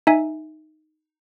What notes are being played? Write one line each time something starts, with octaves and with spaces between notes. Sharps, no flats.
D#4 E5 G#5